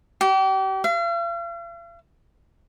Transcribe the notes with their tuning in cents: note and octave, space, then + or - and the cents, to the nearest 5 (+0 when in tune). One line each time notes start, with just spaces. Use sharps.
G4 -35
F5 -45